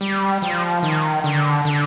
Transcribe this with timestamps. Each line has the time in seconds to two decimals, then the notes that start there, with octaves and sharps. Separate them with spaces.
0.01 G3
0.42 F3
0.83 D#3
1.24 D3
1.65 D3